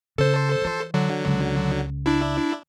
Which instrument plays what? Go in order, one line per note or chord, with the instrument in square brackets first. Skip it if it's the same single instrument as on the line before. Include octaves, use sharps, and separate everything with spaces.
[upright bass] C#3 [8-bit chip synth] A4 C5
[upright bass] E3 F4
[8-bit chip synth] D3 F#3
[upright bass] C#2 C#3
[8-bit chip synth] D4 E4